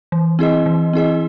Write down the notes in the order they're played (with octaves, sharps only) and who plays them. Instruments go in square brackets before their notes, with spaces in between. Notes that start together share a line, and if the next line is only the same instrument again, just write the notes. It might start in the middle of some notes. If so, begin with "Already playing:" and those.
[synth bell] E3
C4 E4 G#4 D#5
E3
C4 E4 G#4 D#5